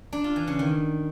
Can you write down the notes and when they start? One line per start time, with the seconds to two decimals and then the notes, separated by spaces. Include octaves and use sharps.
0.13 D4
0.24 F4
0.36 E3
0.48 C#3
0.59 D#3